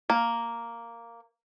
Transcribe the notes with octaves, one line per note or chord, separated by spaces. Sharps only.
A#3